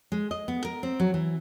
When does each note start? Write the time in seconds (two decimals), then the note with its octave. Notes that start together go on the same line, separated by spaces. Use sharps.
0.12 G#3
0.31 D#5
0.48 B3
0.65 A#4
0.83 C4
1.00 F#3
1.14 E3